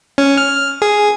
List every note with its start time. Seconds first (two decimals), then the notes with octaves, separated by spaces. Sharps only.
0.18 C#4
0.37 F6
0.82 G#4